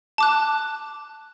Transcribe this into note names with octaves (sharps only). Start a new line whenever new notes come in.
A5 D6 F#6